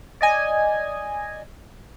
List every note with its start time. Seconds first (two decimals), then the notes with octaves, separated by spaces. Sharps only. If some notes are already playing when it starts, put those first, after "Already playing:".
0.21 D5 D#5 G#5